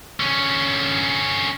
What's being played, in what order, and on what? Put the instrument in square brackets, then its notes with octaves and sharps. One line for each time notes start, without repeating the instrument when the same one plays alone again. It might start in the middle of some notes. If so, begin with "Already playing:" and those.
[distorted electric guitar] D3 C#4